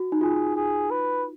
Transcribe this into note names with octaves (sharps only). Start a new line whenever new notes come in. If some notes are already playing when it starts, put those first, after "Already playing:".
Already playing: F#4
D#4
F4 G#4
G#4
B4